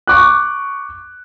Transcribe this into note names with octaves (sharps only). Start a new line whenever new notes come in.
C#6 D6 F#6